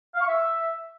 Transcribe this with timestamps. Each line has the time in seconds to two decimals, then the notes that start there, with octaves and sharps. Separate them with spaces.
0.15 F5
0.21 C#6
0.27 E5